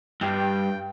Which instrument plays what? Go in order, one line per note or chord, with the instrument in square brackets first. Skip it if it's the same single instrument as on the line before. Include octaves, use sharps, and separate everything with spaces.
[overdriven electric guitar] G2 [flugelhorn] G5